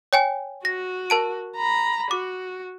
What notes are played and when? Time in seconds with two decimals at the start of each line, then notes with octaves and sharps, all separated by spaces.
0.13 C#5 G5 G#5
0.65 F#4 A#6
1.10 A#4 A5 D7
1.56 A#5 B5
2.11 F#4 D6